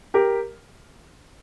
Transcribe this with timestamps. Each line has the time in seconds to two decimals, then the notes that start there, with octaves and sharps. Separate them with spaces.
0.14 G4 A#4